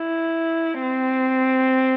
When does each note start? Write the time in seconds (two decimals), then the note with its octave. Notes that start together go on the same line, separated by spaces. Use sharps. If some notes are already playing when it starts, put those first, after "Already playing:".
Already playing: E4
0.82 C4